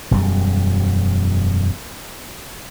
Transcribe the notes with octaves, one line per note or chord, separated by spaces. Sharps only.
E1 F#2 G3